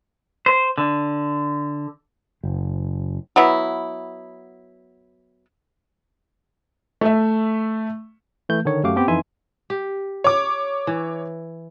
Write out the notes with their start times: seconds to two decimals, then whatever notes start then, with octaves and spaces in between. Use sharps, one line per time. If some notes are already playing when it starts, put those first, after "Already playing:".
0.46 C5
0.78 D3
2.44 F#1
3.36 F#3 B3 E4
7.01 A3 E5
8.49 E3 A3 G6
8.65 D3 D#3 C#5
8.83 F#2 A3 F#4 G4 F5 D6
8.96 B3 C4 G4
9.08 F2 E3 D#4 E5 G#5 C6
9.70 G4
10.24 C#5 D6
10.87 E3